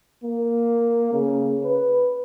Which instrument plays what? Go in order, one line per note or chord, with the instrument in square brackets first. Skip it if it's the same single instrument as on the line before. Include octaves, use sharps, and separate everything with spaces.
[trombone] A#3
C#3
B4